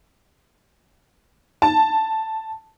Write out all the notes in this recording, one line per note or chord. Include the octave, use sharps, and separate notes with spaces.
A5